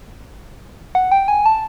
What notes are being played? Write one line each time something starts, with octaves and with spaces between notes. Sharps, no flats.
F#5
G5
G#5
A5